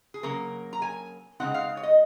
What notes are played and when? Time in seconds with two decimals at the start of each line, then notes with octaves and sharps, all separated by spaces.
0.14 G#4
0.23 C#3 F#3 A#3 A#4
0.73 A#5
0.82 G#5
1.40 C#3 G#3 C4 D#4 F#5
1.54 F5
1.77 C#5
1.83 D#5